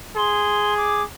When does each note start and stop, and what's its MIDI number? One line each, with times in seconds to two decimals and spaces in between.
0.16 1.04 68
0.16 0.74 84
0.77 1.03 86